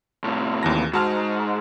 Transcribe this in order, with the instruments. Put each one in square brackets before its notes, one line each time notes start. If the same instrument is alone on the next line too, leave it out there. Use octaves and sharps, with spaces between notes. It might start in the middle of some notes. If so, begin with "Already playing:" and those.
[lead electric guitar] A2 C3
[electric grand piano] D#2 E3 A#6
[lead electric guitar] G#2 [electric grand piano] F#4 A5 F6